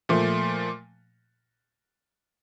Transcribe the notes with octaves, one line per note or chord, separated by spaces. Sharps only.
A#2 F3 A3